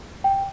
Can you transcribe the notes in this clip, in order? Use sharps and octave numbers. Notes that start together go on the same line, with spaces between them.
G5